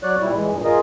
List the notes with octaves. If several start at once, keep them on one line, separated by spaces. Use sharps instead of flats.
F#3 C#5 D5 F#6
A#2 G3 E4
E3 G#3
G2 A#2
F4 G#4 A#4 D#5